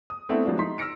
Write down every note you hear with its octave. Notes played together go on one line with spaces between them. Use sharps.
D#6
A3 B3 C4 D4 E4 A4
F3 F#3 G#3 B3 D4 F4
D#4 C6 B6
E6 F6 A#6 C#7 D7